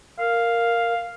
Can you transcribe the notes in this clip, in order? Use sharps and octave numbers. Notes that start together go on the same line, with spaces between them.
A#4 F5